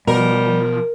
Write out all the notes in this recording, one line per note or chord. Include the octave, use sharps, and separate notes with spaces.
B2 F3 G3 A#4